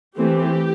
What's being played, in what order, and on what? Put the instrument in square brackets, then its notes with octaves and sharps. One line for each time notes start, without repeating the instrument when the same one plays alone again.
[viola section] E3 A3 C4 G4